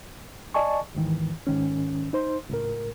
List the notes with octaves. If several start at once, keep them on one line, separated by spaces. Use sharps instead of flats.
D5 D#5 G#5 A5 C#6
D#2 G#2 D#3 E3
G#2 D#3 C#4
D#4 C5 C6
C#2 A2 A#4